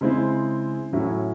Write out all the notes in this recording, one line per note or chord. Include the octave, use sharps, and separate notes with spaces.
C#3 G#3 C4 E4
A2 F#3 C#4 E4